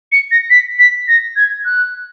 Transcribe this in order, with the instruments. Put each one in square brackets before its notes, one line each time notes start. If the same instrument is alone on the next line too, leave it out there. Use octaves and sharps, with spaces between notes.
[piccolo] C#7
A#6
B6
B6
A#6
G#6
F#6